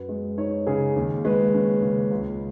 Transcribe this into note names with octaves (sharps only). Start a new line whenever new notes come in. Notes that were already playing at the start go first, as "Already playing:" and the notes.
Already playing: F#2 B4
G#3
D#4 C#5
C#3 G#4
D#2
G#3 B4
C#4
C#3
C#2